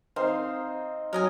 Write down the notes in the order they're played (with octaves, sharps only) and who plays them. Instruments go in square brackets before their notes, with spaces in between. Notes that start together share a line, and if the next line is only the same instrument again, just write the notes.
[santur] C4 D#4 [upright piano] C5 [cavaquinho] F5
[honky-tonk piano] F#3 [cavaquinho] A#4 D#5 G#5